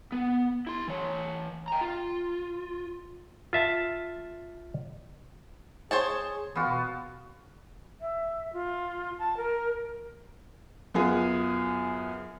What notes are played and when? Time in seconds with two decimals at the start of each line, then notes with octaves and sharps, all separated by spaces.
0.12 B3
0.67 E4 C6
0.88 E3 C#5
1.68 G5 A#5
1.81 F4
3.53 F4 E5 A5
5.91 G#4 C5 C#5 A5
6.55 E3 B3 F4 F#4
6.67 B2
8.01 E5
8.53 F4
9.19 A5
9.37 A#4
10.94 F#2 B3 F4 G#4